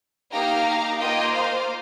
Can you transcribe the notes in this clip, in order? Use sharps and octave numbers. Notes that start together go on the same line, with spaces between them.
A#3 D#4 G4 F5 A#5
A#3 F4 D#5 G5
C5 F5